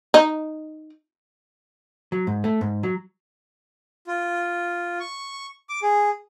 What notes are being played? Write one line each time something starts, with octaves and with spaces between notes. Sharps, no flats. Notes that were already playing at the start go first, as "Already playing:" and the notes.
D#4
F#3
G#2
A3
G#2
F#3
F4
C#6
D6
G#4